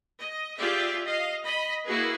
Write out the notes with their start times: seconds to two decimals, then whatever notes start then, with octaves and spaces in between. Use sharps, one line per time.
0.19 D#5
0.58 F4 G4 G#4 D5 E5
1.06 D#5 F5
1.45 D#5 B5
1.86 A#3 E4 F#4 G#4 B4